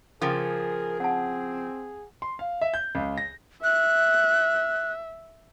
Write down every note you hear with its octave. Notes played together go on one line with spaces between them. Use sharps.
C#3 F3 G#4 A#4 F5 G5 D6
C4 F#5 A5
C6
F5
E5
G6
C#2
A#6
E5 F#6